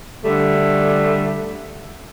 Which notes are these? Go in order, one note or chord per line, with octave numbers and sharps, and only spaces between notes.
D3 G3 A3